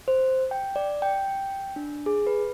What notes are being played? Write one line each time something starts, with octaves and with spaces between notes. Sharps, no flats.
C5
G5
D5
G5
D4
G#4
B4